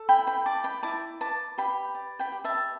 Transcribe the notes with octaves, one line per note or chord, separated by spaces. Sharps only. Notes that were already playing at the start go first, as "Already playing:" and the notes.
Already playing: A4
E4 G5 B5
G5 B5
D5 A5 D6
G5 B5
E4 A5 D6
B4 A5 D6
G4 G5 B5
D5
G5 B5
G4
E5 A5